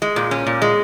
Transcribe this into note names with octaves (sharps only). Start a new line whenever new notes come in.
G#3
A#2
C#4
A#2
G#3